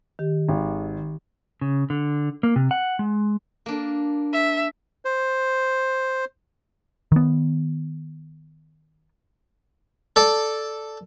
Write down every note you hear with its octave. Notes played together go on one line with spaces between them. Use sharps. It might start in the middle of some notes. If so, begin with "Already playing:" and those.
D#3 G4
G#1
C#3
D3
A#3
C3
F#5
G#3
A#3 D4
E5
C5
D#3 B3
A4 D5 A5